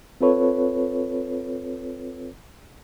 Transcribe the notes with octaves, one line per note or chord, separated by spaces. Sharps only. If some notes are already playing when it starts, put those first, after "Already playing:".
C4 F4 A4 B4 C#5